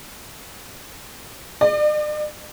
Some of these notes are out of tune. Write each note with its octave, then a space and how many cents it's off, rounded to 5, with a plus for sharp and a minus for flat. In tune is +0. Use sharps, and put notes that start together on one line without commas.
D5 +40